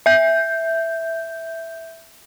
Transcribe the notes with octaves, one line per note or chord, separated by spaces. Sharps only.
E5 G6